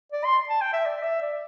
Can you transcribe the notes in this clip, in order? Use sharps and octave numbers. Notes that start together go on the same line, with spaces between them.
D5
C6
A5
G5
E5
D5
E5
D5